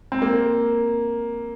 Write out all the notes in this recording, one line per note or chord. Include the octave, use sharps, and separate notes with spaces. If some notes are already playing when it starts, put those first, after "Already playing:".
C4
A#3